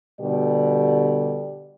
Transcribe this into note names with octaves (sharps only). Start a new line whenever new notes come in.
B2 D3 G3 G4 D5